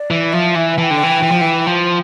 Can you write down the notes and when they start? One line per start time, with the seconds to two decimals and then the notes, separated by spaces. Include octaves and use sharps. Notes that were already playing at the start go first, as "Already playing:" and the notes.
Already playing: D5
0.11 E3
0.33 F3 E5
0.55 E3
0.78 E3 A5
0.83 G5
0.91 D3
1.04 E3
1.22 E3
1.32 F3
1.41 E3
1.67 F3